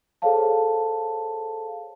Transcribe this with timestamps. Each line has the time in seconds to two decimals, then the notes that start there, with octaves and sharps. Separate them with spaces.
0.22 G#4 A4 C5 C#5 F5 A5